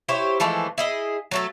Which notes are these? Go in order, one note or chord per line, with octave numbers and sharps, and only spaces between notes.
E4 G4 C5 C#5
E3 F3 G#3 A3
E4 G#4 D#5
F#3 A3 A4